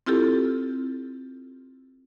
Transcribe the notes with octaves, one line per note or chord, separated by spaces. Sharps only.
C4 E4 F4 G4 A4